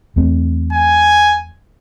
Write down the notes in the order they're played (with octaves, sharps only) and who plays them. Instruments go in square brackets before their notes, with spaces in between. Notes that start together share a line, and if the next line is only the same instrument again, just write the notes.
[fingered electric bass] E2 A3 C4
[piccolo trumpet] G#5